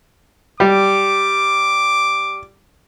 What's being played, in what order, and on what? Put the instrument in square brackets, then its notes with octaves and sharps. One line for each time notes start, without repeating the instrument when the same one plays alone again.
[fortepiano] G3 [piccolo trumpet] D6